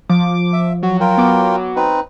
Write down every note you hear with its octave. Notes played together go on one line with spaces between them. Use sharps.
F3 D6
E5
F#3 F#4
F4 A#4 G5
B3 D6
C4 D#4 B4